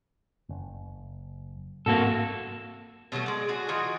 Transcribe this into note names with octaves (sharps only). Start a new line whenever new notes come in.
F#1
A1 G#2 A#3 C4 F#4 A4
B2 F#3 G3 A3
G#3 D5
D4 F#4 G#4
E3 D#4 F4 F#4